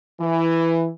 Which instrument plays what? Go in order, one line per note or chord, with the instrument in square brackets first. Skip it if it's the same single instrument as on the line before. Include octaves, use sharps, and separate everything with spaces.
[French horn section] E3